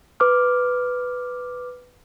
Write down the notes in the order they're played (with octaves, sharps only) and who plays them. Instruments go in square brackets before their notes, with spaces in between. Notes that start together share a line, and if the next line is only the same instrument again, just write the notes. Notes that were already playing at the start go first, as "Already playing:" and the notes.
[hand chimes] B4 D6 F6